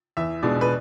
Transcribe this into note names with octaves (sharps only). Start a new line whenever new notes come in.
E2 E5
B2 G#3 B3 D4 D5
B4